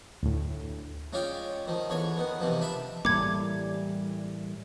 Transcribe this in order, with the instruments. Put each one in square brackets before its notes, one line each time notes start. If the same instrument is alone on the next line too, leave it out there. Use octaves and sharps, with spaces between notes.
[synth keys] D2 A2
[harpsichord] G#3 C#4 F4 C#5 D5 G5
D#3 F3
E2 D3 C#5 C#6
D#3 B3
E2 C3 D#3 F3
D4 E5 A5 B5
[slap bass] A2 E3 A#3 [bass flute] G3 [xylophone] D6 G#6